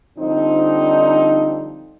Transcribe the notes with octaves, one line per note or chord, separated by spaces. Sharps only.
D3 F3 G3 C4 D#4